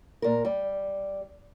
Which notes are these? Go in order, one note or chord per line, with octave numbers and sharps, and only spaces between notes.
A#2 A#4
G3